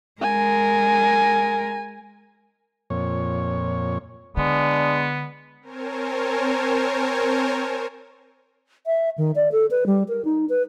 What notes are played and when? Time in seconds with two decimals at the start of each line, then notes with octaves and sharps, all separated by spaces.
0.22 G#3 A#4 G#5
2.90 F2 A#2 C#5
4.37 D3 G#3 B3 D4
5.61 C4 A#4 C5 C#5 G#5 A5
8.86 E5
9.18 D#3
9.35 D5
9.52 A4
9.71 B4
9.86 G3
10.08 A#4
10.25 D#4
10.49 B4